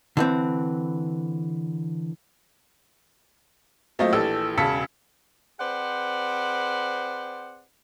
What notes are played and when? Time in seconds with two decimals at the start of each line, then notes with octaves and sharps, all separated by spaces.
0.17 D3 E3 C4
3.99 F#3 A3 A#3 C4 F4 D#5
4.13 A#1 E3 G4 A4 E6
4.58 E1 C#3 A5 E6 B6 C#7
5.60 C4 G#4 B4 C5 D5 F#5